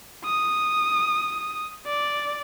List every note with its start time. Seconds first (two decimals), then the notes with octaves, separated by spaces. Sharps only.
0.25 D#6
1.86 D5